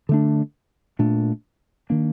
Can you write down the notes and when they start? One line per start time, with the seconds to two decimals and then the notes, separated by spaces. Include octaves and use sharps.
0.09 D3 A3 D4
0.99 A#2 A3 D4
1.90 D#3 A#3 D4